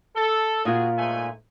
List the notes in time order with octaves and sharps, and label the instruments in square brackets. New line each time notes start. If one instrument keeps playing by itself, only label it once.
[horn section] A4
[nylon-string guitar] A#2 F4 [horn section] F#4 G#4
[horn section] G#2 A3 G#5